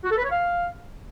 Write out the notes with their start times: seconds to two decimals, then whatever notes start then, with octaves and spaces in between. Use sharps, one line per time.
0.04 F#4
0.10 A4
0.17 B4
0.24 C#5
0.31 F5